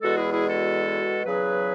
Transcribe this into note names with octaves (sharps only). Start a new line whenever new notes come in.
E2 B2 G#3 F#4 A4
E4 G#4
E4 G#4
F#4 A4
E2 C#3 F#3 G#4 B4